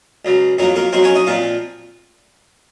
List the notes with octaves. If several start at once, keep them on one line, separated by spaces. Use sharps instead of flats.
C#2 C#3 F#3
F2 D#3 F#3 A#3 F#4
A#3 A#4
F2 D#3 F#3 A#3 C4 C5
C#4 C#5
D#4 D#5
A#2 F3 C4 F4 F5